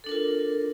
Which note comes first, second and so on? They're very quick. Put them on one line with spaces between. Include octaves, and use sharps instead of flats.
A4 D4 A#4 F4